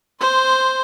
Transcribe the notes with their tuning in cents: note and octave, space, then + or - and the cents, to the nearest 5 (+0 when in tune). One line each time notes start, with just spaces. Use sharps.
C5 +0 C6 -10